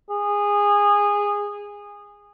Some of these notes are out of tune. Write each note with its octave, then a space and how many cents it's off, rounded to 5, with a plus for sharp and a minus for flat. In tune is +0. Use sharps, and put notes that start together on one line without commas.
G#4 -20